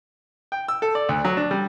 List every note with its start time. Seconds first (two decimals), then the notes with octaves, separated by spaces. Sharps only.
0.52 G5
0.68 E6
0.82 A4
0.95 D5
1.09 D2
1.25 F#3
1.37 D4
1.51 G3